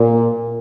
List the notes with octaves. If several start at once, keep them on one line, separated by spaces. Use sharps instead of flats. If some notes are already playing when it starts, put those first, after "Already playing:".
Already playing: A#2